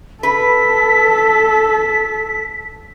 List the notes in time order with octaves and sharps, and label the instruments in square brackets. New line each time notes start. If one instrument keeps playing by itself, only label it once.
[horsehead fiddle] A4 [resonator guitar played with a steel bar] B4 [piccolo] B6